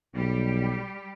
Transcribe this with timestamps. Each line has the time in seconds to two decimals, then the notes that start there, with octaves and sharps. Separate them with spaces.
0.15 B1 G3 G4